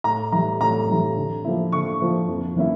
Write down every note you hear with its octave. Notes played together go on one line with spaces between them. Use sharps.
A2 A#5
E3 G3 A#5
A2 A#5
E3 G3
D3
F3 A#3 E4
D3 C#6
F3 A#3 E4
F2
E3 A#3 C#4 E4